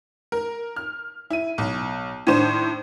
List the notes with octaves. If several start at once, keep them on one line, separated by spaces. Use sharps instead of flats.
A#4
F6
E4 D#7
B1
A2 D#3 D4 C5 E7